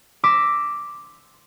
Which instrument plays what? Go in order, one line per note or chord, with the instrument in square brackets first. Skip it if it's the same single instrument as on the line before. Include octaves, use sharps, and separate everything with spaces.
[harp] C6 D6 E6 A#6 B6